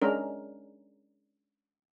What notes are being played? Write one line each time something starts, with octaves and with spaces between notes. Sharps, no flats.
G#3 C#4 D4 A#4